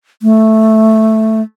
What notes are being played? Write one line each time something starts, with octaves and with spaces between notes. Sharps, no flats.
A3